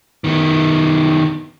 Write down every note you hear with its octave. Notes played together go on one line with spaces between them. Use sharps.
D#3 B3